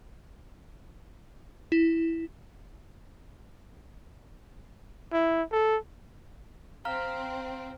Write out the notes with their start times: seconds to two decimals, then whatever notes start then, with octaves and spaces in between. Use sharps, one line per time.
1.72 E4
5.13 E4
5.52 A4
6.85 C4 F5 A#5 F6